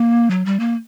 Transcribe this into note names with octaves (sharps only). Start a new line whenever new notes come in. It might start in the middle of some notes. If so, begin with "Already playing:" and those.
Already playing: A#3
F#3
G3
A#3